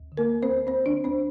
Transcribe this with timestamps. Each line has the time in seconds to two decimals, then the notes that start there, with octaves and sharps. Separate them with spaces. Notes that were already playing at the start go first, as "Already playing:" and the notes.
Already playing: D2
0.12 D3
0.17 A#3 A#4
0.31 D2
0.43 C4 C5
0.49 D2
0.67 D2 C4 C5
0.86 D3 D4 D5
1.04 D2 C4 C5